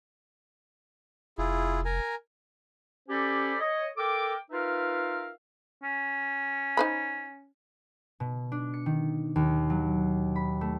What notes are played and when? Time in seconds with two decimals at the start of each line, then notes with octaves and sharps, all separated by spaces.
1.38 F1 E4 F4 G#4
1.85 A#4 G#5 A#5
3.09 C#4 G4 A4 C5 D5 B5
3.60 C#5 D#5
3.97 A4 A#4 G5 D6
4.51 D#4 F4 A#4 B4 E5 F5
5.83 C#4
6.77 D#4 C5 B5
8.20 B2
8.52 D4
8.74 C#7
8.86 D#3
9.36 D#2
9.70 F#3
10.36 B5
10.61 A3